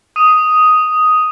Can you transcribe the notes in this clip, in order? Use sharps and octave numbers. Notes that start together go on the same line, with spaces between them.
D#6 D#7